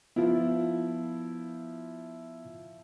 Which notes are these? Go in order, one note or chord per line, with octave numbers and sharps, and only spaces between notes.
F3 B3 E4 F4